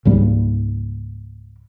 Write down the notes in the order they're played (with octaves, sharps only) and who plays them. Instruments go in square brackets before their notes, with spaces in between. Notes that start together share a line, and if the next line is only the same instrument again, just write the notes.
[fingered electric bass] C#2 G#2 G3 A#3